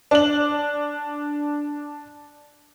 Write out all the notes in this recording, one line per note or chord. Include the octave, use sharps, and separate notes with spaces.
D4 F#7